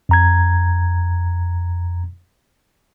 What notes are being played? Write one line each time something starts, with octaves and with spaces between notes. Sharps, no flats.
F2 A#5 G#6